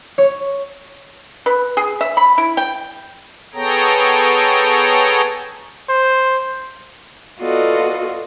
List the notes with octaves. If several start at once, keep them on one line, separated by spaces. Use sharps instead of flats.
C#5
B4
G#4
E5
B5
E4
G5
B3 G#4 A4 C#5 G5 A#5
C5
B3 F4 F#4 A4 D5 D#5